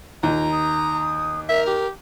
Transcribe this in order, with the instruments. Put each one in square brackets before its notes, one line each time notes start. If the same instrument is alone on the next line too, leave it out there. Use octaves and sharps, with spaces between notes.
[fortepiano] D#2 [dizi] F4 [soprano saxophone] A#5
[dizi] D#6
[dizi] A#4 [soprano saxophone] E5
[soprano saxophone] G4